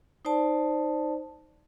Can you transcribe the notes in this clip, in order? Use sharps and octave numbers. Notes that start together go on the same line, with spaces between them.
D#4 C5 D5 A5